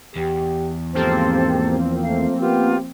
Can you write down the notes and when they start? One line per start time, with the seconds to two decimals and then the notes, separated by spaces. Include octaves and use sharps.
0.16 E2 G4
0.94 G#2 F3 A#3 C4 G4 A4 C5
2.04 A3 F5
2.39 B3 F4 G4